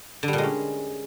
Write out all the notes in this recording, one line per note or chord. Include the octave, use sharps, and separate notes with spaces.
D3
G3
A#2
G#3
C#4